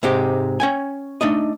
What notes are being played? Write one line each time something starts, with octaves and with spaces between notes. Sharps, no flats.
G#2 C3 G#3 G4
C#4 G5 G#5
A3 D4 D#4 D#5